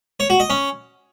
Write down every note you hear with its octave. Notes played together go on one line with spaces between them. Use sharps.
C#5
F#4
D#5
C#4